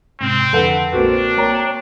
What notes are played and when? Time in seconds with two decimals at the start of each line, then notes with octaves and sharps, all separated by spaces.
0.21 G#2 C3 C4 F6
0.53 F2 D3 A4 B4 F#5
0.93 A#1 A#3 C4 D4 F#4
1.38 A#3 C#5 G5 A#5